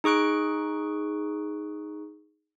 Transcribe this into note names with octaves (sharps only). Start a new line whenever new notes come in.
D#4 G#4 C#6 F#6 D7